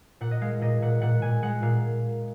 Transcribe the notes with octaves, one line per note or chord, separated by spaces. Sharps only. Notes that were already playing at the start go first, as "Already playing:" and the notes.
A#2 F#5
D#5
G#3 F5
A#2 D#5
A#2 F#5
A#2 F#5
A#2 G#5
G#3 F#5
A#2 F5